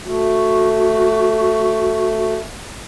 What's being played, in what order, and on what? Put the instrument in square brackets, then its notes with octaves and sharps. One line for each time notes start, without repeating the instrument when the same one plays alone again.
[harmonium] A3 [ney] F#4